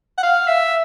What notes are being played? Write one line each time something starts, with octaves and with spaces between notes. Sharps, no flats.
F#5
F5
E5